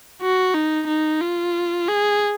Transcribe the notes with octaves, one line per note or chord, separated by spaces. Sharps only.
F#4
D#4
D#4
F4
G#4